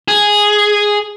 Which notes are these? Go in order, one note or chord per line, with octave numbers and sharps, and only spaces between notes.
G#4